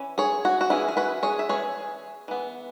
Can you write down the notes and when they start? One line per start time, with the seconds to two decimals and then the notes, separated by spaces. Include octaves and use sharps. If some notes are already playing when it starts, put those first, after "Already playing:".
Already playing: E3 C#4
0.18 G#4 C#5
0.45 F#4
0.61 F#4
0.70 E3 C#4 E4 G#4
0.88 G#4
0.97 F#4 B4
1.23 G#4 C#5
1.39 E5
1.49 E3 C#4 G#4 C#5
2.28 E3 B3